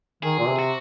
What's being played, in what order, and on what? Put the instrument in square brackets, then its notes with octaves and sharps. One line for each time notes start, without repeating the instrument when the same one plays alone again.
[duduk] D#3 [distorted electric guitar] G#4
[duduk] A#2
C3
[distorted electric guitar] F#4